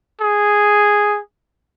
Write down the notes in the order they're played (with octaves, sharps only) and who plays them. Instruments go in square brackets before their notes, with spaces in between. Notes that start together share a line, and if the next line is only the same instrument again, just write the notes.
[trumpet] G#4